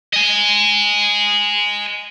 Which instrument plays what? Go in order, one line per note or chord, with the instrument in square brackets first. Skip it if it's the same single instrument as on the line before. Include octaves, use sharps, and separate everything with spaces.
[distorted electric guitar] D#5 G#5